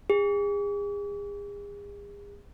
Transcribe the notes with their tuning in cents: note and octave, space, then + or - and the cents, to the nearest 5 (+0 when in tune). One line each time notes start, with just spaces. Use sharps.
G#4 -35